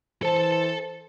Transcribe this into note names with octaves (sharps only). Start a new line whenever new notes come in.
E3 A4 C5 A5